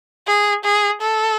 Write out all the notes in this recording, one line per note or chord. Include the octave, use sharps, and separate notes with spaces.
G#4
G#4
A4